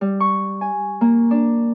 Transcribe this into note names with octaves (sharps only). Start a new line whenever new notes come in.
G3
C#6
G#5
A#3
D4